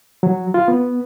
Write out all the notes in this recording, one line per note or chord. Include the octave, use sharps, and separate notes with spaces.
F#3
F4
B3